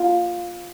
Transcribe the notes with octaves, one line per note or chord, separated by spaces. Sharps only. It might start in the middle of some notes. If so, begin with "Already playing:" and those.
Already playing: F4